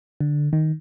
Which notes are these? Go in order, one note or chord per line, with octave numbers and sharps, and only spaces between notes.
D3
D#3